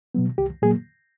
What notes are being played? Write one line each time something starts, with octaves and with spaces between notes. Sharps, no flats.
B2 F#3 B3
C2 G4
A#2 F#3 A#3 G#4